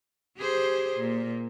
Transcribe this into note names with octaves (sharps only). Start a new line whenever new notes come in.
G4 G#4 C5
A#2